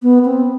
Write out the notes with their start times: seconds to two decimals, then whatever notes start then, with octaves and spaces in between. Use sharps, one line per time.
0.03 B3
0.25 C4